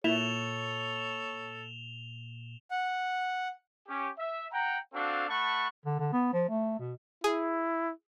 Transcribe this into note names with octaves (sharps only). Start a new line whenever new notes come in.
A#2 E4 A4 C#5 E7 F7 G7
F#5
C#4 G4
E5
F#5 G5 A#5
C4 D4 F#4 A4 F5
A3 F#5 A5 B5 C#6
D3
D3
B3
F3
A3
B2
E4 G#4